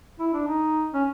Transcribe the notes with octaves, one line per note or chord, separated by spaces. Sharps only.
E4
D4
D#4
C#4